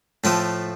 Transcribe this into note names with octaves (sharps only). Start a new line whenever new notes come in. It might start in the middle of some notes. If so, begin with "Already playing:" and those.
A2 F3 A3 F4